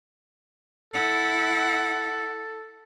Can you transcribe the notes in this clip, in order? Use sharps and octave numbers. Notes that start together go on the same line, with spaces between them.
E4 A4 F#5